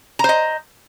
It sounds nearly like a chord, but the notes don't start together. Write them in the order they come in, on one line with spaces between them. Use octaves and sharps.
A#5 C5 D#5